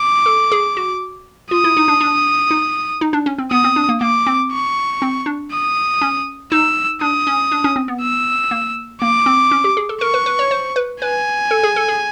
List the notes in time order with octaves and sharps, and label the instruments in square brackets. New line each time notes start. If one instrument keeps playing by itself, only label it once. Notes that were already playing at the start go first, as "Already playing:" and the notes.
Already playing: [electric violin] D6
[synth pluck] A4
G#4
F#4
[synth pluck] F4 [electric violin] D#6
[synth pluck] E4
D#4
D4
D4
D#4
D#4
D4
C#4
C4
[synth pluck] B3 [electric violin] D#6
[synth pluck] C4
D4
A#3
[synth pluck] A#3 [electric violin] D6
[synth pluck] C4
[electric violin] C#6
[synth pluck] C4
D4
[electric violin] D#6
[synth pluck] C#4
[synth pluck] D#4 [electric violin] E6
[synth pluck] D4 [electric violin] D#6
[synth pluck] C#4
D4
C#4
C4
B3
[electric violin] E6
[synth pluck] A#3
[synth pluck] A#3 [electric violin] D6
[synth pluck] C4
C#4
G4
G#4
A4
[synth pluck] A#4 [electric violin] C#6
[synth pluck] B4
B4
C#5
C5
B4
[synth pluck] B4 [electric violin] G#5
[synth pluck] A4
G#4
A4
G#4